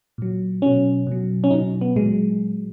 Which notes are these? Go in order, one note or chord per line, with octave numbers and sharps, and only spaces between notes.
A#2 F#3
B2 F#3 C#4
B2 F#3
C#4
B2 F#3 D#4
B3
A#2 F#3 G#3